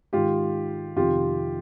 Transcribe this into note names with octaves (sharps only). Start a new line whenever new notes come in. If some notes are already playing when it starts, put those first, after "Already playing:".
G#2 D#3 F4 G4
F2 C3 D#3 F4 G4